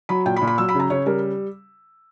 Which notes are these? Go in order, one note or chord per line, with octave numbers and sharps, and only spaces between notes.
F#3 B5
A#2 G5
B5
A#2
B5
F#3 E6
B5
C#3
A#5
C#3 C#5
G3 A#4